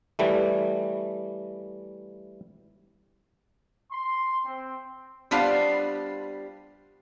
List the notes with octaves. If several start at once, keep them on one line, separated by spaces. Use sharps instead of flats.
E3 G3 A3
C6
C4
G3 B3 D4 F4 C5 F5